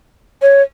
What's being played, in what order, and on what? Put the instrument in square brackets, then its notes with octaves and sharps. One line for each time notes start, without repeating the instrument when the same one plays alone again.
[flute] C#5